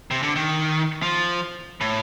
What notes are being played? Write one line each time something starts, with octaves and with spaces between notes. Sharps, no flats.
C3
D3
D#3
F3
A2